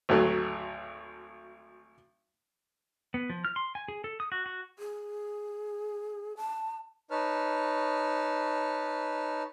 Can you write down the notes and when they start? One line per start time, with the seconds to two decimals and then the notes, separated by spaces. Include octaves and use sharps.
0.09 G#1 D2 F#3 A3
3.14 B3
3.30 F3
3.45 F6
3.56 C6
3.75 G#5
3.88 G#4
4.04 A4
4.20 D#6
4.32 F#4
4.46 F#4
4.79 G#4
6.37 A5
7.11 D#4 B4 C#5 A5 F6